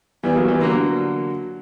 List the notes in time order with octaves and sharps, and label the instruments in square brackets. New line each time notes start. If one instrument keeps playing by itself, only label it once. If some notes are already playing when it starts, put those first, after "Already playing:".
[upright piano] E3 G3 [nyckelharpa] B3
[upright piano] F#3 A#3
E3 G3
[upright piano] D3 F#3 [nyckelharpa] A#3